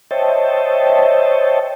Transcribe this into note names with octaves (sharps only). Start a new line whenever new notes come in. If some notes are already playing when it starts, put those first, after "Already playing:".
C5 C#5 D#5 E5 G5 A5